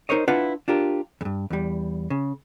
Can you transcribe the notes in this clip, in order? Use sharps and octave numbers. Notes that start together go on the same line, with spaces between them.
D#4 G4 A#4 C5 C#5 D#5
D4 E4 F4 B4 F5 F#5
D4 F4 G4 A#4
E2 G2
E2 G3
C#3